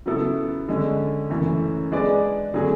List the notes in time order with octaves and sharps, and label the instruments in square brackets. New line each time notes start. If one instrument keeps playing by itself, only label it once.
[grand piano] C#3 F#3 B3 E4 A4
D3 G#3 C#4
F#2 C#3 E3 A3 C#4
G#3 D4 G#4 B4 D5
D3 F#3 A3 C#4 G#4